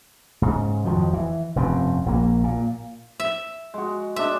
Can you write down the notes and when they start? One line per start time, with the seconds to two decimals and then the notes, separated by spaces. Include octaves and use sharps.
0.42 G#2 C#3
0.85 F2 D#3 F3 F#3
1.13 E3
1.56 F1 G2 C#3 C4
2.06 A#1 A#3
2.44 A#2
3.20 E5
3.74 G#3 F#4
4.16 G#3 D4 E5